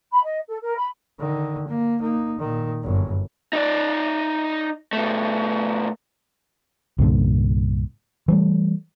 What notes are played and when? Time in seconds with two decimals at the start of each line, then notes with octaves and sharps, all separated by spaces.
0.11 B5
0.24 D#5
0.48 A4
0.62 A#4
0.77 B5
1.20 D3 D#3
1.68 A#3
2.01 A#3 D#4
2.39 A#2 D#3
2.82 G1 F#2
3.53 D#4 D5
4.93 B2 A3
6.99 C2 G2 A#2 D3
8.28 E3 G3 A3